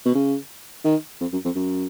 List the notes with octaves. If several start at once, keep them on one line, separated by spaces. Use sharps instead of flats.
B2
C#3
D#3
F2
F#2
F2
F#2